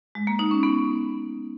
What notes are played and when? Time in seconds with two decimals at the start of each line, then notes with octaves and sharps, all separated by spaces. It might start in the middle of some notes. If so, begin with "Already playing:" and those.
0.15 G#3
0.27 A#3
0.39 D#4
0.51 C#4
0.63 B3